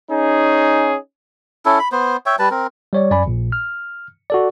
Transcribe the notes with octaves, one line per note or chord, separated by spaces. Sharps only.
C#4 D#4 G#4
C#4 E4 A4
B5
B3 C5
C#5 E5 G5
G3 B4 A5
C4 A#4
G3 C#5 D5
F#2 D5 G#5 B5
A#1 A#2
F6
F#4 A4 D5